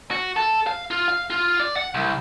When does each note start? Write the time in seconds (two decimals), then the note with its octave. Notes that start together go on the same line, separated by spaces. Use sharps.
0.11 F#4
0.36 A4
0.67 F5
0.91 F4
1.08 F5
1.30 F4
1.60 D5
1.76 F#5
1.94 C2